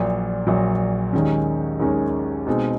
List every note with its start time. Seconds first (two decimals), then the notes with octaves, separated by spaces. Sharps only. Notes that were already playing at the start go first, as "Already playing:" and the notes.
Already playing: A#1 A#2 F#3
0.47 A#1 A#2 F#3
1.13 D#2 D#3 G#3 C#4
1.80 D#2 D#3 G#3 C#4
2.47 B2 G#3 C4 D#4 G#4